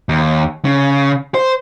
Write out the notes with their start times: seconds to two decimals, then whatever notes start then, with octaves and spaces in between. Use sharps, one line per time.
0.09 D#2
0.65 C#3
1.34 C5